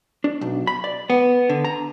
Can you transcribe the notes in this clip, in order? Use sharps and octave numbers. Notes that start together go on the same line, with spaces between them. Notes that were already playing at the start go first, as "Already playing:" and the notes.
D4
B1
B5
D5
B3
D3
A#5